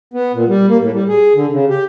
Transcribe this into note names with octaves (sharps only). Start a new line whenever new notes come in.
B3
A#2
G3
A#3
A2
G3
G#4
D3
C#3
G4